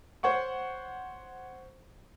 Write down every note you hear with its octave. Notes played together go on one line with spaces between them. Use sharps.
C5 C#5 F#5 C#6